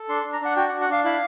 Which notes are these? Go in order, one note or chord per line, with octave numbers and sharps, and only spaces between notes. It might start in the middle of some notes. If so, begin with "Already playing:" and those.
Already playing: A4
D4 C6
C6
D4
A#5
D4 F#5
F#4 G5
F#5
D4
F#5
D4 F5
E4 F5